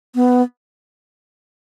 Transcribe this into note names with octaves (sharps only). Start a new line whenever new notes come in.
B3